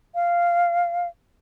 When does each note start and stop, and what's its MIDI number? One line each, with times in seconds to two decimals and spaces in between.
0.15 1.08 77